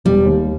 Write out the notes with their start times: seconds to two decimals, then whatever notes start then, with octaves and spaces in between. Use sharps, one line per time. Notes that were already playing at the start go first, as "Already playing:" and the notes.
0.05 E1 G3
0.26 D#2